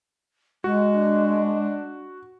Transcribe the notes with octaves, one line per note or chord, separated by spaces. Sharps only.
G#3 F#4
D4